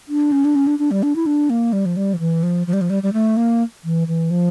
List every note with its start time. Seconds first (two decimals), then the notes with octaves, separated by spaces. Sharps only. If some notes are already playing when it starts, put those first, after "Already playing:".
0.08 D4
0.32 C#4
0.45 D4
0.55 C#4
0.67 D4
0.79 D4
0.91 G3
1.03 D4
1.16 E4
1.26 D4
1.50 A#3
1.73 G3
1.86 F3
1.97 G3
2.14 F3
2.19 E3
2.43 F3
2.67 F3
2.73 G3
2.81 F3
2.90 G3
3.03 G3
3.13 A3
3.37 A#3
3.84 E3
4.08 E3
4.31 F3